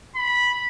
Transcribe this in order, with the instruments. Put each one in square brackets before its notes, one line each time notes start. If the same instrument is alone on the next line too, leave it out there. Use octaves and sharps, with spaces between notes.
[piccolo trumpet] B5